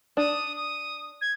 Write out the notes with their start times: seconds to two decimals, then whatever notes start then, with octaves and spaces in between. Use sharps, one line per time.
0.17 D4 D#6
0.56 D#6
1.21 G#6